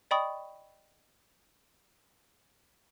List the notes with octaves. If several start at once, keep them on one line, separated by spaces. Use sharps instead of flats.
D5 D#5 G5 B5 C#6 D#6